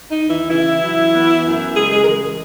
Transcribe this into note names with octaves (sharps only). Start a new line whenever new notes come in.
D#4
D#2
E3 E4
C#3 E3 E4
F#3
B3
F#2
C#3 G#3 G#4
G#3 G#4
A#4
E3 G#3 G#4
G#3 G#4